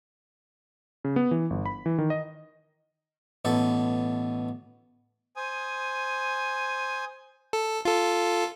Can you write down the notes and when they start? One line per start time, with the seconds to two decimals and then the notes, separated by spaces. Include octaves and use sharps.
1.04 C#3
1.16 B3
1.31 E3
1.50 G1
1.66 B5
1.86 E3
1.98 D#3
2.10 D#5
3.45 A1 B2 A4
5.36 C5 G#5 D#6
7.53 A4
7.85 F4 A4